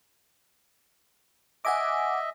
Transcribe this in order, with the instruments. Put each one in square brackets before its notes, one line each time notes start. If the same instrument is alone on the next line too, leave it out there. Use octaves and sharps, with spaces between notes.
[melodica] D#5 E5 [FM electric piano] F#5 G#5 D6